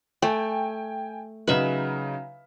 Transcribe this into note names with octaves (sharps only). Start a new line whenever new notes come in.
A3 G5 G#5
C#3 F#3 D#4 B4 E5